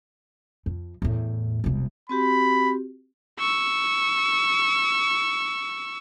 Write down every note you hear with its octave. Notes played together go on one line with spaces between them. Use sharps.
F2
E2 A2
E1 C2
C4 F#4 G4 B5
C#6 E6